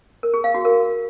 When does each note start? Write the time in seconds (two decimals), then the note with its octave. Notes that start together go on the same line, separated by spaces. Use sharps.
0.23 A#4
0.34 G#4
0.44 F5
0.54 F#4
0.65 A#4